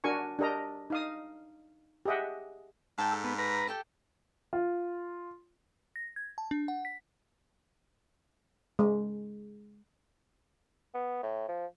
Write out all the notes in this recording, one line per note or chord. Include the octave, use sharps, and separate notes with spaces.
D4 F#4 A#4 G#5 C#6
D4 G4 A#4 D#5 A#5
D#4 F5 D#6
G4 G#4 D#5 E5 F#5
G#2 G5 A5
A4
B3
B4 A#5
G4 A4 G5
F4
A#6
G#6
A5
D4
F#5
B6
G#3
B3
A2
F3